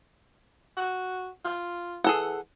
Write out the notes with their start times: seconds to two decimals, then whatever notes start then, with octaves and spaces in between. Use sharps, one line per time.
0.77 F#4
1.45 F4
2.04 E3 G#4 A4 F#5